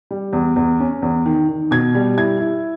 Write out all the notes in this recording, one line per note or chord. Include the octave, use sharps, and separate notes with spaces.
G3
E2
E2
C#4
E2
D#3
D#3
B2 G#6
G3
E4 G#6
E4